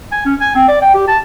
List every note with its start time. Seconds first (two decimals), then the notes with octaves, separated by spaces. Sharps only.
0.12 G#5
0.26 C#4
0.41 G#5
0.55 C4
0.68 D5
0.82 G5
0.94 G4
1.08 A5